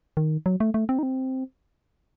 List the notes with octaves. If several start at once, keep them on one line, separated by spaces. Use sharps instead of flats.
D#3
F#3
A3
A3
C4
D#4
C4